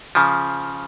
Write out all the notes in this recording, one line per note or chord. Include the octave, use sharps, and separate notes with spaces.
C#3 F3